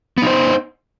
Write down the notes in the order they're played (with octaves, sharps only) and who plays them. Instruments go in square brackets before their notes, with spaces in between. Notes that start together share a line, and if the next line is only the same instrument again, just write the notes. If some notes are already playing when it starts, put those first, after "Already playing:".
[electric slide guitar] B3
D#4
C5